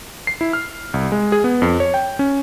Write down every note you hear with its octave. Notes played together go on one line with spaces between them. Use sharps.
C7
E4
F6
C2
G#3
G#4
B3
F2
C#5
G5
C#4